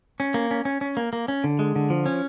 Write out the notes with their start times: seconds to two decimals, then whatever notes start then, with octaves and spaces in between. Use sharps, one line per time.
0.20 C#4
0.34 A#3
0.51 C#4
0.65 C#4
0.81 C#4
0.97 A#3
1.13 A#3
1.28 C#4
1.44 D3
1.59 G#3
1.76 D3
1.90 F3
2.06 C#4